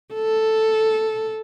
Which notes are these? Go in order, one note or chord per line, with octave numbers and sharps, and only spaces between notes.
A4